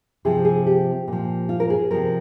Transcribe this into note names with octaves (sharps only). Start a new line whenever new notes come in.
C3 F3 G#4
G#4
G4
A#2 F3
F4
A#4
G#4
C3 F3 A#4